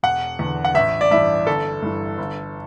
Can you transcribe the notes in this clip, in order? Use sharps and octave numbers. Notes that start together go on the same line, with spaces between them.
E1 F#5
E2
D3
F#5
A1 E5
D5
G2 E3 E5
G1 A4
G2 E3
G1